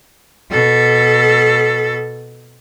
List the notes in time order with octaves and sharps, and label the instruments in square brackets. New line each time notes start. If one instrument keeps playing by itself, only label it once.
[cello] B2 A4